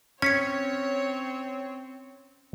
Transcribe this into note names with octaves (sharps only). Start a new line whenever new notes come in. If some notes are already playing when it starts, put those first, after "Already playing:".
C4 C#4 C#5 G#6 B6 C#7